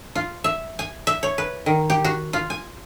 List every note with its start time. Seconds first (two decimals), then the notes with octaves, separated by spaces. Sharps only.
0.15 F4
0.44 E5
0.79 G#5
1.07 E5
1.23 C#5
1.38 B4
1.66 D#3
1.90 G4
2.04 F#4
2.33 F4
2.50 G#5